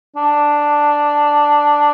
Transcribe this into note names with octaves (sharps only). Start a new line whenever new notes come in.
D4